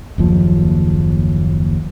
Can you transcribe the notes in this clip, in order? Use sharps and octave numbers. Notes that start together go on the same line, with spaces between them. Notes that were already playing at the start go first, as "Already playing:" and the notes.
F#1 D#2 F3